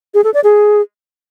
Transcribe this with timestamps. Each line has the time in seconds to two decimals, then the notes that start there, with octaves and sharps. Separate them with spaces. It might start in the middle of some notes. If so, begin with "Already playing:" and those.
0.14 G#4
0.24 A4
0.34 D5
0.44 G#4